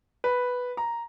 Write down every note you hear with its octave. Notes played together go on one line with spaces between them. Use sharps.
B4
A#5